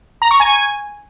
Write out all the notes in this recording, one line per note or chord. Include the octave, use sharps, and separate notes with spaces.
A#5
C#6
G#5